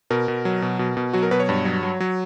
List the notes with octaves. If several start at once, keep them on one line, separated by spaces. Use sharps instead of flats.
B2 A#4
B2
F#3
B2
B2
B2
F#3 F#4
A#4
B2 B4
C#5
G2
F#3
F#3
F#3